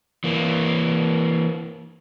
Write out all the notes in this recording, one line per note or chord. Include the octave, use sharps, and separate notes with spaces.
E3 A#3